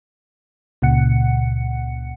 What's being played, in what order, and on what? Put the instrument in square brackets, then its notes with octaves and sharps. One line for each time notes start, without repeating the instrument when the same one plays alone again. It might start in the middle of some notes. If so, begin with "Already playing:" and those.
[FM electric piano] C#2 A#2 C#3 F#5 C#7